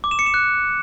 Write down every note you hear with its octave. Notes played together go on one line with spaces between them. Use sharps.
D6
E7
C#7
E7
F#6